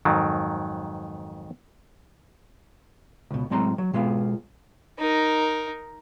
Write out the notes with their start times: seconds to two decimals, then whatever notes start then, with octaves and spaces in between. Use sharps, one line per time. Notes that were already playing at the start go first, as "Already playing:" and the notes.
0.05 F2 G#2 D#3 F#3
3.31 C#2 B2
3.50 A2 F#3 G#3 C4 A#5 C6
3.78 F#3
3.93 B2 G#3 B3 F4 F5
4.99 D#4 A#4